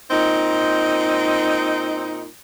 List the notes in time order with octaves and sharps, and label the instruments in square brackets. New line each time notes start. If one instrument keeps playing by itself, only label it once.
[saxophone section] A#2 C4 D#4